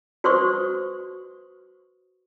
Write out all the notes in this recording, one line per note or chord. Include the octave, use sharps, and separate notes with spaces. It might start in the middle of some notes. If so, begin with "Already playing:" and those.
F#4 B4 C5 C6 C#6 D#6